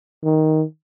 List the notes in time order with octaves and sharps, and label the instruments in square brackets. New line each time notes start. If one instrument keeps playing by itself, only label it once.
[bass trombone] D#3